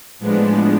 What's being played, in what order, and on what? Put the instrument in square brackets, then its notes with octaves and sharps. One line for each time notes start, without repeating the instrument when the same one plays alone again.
[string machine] A2 F3 G#3 B3 D4